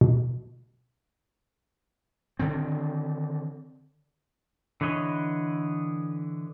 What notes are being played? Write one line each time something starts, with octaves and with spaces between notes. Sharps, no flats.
B2
D3 D#3 C4
D3 E3 B4 C#5 D#5